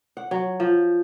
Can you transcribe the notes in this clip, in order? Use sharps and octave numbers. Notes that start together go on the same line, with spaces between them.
F#5
F#3
F3